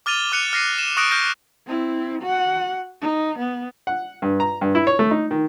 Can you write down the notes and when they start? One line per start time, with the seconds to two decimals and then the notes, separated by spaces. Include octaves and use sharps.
0.06 D6 F6 A6 D#7 F7 G7
0.32 D6 F#6 C#7 D#7 F7
0.53 F6 A#6 C7 D#7
0.78 E7
0.97 C#6 D#6 F#6 A#6 C#7 D7
1.11 F6 G6 A#6
1.67 C4 E4
2.22 F#4 F#5
3.01 D#4
3.38 B3
3.87 F#5
4.22 G2
4.40 A#5
4.61 G2
4.75 E4
4.87 C#5
4.99 A3
5.11 D#4
5.31 D#3